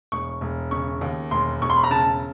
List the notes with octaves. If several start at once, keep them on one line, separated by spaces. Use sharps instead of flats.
E1 C#6
E1
C#3 C#6
D#2
E1 C6
E1 C#6
C6
B5
A#5
C#3 A5